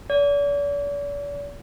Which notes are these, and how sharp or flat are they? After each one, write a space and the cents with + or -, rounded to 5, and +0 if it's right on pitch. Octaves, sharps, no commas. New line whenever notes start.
D5 -45